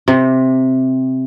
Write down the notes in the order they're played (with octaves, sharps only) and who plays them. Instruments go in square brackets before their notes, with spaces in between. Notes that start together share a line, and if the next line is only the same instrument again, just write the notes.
[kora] C3